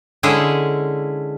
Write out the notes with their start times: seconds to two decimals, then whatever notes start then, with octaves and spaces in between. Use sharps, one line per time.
0.23 D3 G#3 C#4 E4 G#4